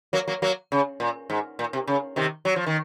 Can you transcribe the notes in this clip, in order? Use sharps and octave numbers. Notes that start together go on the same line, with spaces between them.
F#3 A#3
F#3 A#3
F#3 A#3
C#3
A#2
G#2
A#2
C3
C#3
C3 D#3
F#3
F3
D#3